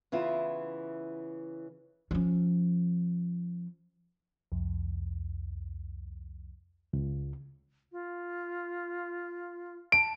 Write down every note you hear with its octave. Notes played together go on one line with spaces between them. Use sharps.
C#3 E3 B3 E4 F4
F3 C#4
C2 F2
C#2
F4
A5 D7